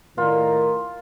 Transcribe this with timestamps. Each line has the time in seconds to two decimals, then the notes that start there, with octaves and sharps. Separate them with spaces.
0.18 A2 D#3 F4 A#4